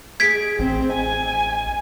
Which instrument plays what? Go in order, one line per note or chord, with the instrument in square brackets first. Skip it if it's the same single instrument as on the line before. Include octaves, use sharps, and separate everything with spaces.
[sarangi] G#4 [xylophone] G#6 B6 D7
[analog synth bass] A1 [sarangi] C4
[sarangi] G#5